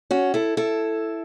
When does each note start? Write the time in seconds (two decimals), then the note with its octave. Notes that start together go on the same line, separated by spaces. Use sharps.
0.11 C#4 F#4
0.34 E4 A4
0.57 E4 A4